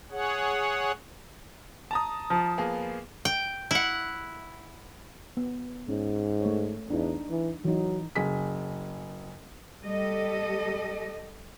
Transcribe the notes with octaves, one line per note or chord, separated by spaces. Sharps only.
G#4 C#5 F#5
A5 A#5 D#6
F3
A#3 B3 G#4
G5
E4 F#5
B3
G#2 C#4
A3 C#5
E2 D4 D#4
E3
E3 F#3 D#4
F#1 G#4 B6
G3 G4 A4 D#5